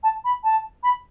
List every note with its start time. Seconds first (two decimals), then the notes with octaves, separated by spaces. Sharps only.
0.03 A5
0.24 B5
0.44 A5
0.83 B5